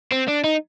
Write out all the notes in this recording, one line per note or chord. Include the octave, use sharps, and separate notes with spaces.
C4
D4
D#4